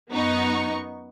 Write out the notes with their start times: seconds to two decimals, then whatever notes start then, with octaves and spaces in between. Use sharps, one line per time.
0.10 F#2 B3 D#4 C#6